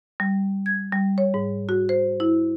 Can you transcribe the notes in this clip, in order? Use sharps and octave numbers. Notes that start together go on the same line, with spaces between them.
G3
G#6
G3
C#5
G#2
F#4
C5
E4